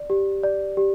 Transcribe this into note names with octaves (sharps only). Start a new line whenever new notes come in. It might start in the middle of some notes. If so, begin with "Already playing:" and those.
Already playing: D5
G4
D5
G4